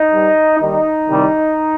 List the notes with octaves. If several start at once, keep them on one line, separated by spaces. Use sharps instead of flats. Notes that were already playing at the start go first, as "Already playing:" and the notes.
Already playing: D#4
G2 G3
D#2 D#3 G3 D#4
C2 C3 D#3 G3